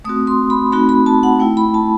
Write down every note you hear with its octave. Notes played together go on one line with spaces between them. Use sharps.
A3 C4 F#4 D#6
C6
B5
A3 C4 D#4 F#4 B5
B5
A5
F#5
A3 E4 G5
B5
A5